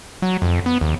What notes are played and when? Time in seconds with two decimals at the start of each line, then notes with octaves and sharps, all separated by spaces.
0.22 F#3
0.42 F2
0.66 B3
0.81 D#2